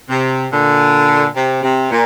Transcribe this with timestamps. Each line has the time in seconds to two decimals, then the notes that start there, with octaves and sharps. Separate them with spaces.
0.09 C3
0.51 A#2 D3
1.35 C3
1.63 C3
1.90 A#2